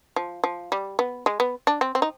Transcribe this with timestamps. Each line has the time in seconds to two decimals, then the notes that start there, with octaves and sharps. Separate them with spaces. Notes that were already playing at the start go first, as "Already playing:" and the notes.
0.16 F3
0.44 F3
0.72 G3
0.99 B3
1.26 G#3
1.40 B3
1.67 D4
1.81 C4
1.95 C4
2.02 D#4